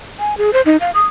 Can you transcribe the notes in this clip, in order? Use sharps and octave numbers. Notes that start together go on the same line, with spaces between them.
G#5
G#4
C5
D#4
F5
D#6